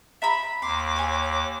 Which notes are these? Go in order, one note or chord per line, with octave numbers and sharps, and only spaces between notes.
E5 A#5 B5
D#2 C6 D6
C#5 G#5